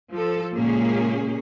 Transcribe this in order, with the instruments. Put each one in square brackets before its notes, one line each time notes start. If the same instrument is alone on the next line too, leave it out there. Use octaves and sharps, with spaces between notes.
[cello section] F3 A4
A#2 C#3 G#3 A#3 C#4 G#4